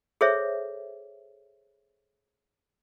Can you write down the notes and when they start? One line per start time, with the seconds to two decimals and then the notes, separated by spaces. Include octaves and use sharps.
0.21 G#4 A4 C5 C#5 E5